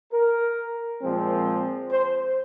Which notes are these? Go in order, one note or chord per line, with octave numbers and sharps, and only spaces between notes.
A#4
A#2 F3 G#3 C4
C5